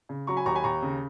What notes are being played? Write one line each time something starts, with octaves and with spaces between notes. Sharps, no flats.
C#3
F#3 A#5 C#6
G#5 B5
D#2 A#5 C#6
G#5 B5
D#2 A#5 C#6
C#3